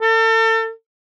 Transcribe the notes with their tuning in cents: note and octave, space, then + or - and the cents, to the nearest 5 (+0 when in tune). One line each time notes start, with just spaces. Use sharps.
A4 +35